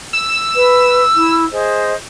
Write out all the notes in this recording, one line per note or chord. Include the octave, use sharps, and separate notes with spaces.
E6
B4
E4
G#4 C5 D#5